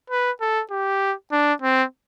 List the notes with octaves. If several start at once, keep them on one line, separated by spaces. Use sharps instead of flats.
B4
A4
G4
D4
C4